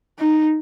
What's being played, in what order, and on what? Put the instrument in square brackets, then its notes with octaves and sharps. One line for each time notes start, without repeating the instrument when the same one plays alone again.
[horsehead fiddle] D#4